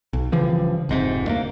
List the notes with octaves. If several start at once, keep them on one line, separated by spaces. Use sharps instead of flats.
B1
G2 C#3 E3 F3
F1 G#2 C3
D2 A3 A#3